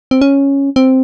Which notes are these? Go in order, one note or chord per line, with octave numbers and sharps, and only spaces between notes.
C4
C#4
C4